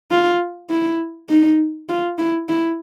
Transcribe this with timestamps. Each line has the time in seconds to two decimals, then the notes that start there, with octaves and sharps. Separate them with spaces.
0.11 F4
0.70 E4
1.29 D#4
1.89 F4
2.18 E4
2.49 E4